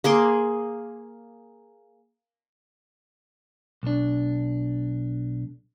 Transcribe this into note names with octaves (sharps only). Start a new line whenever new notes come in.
A#3 G#4 C6 D6
B1 D4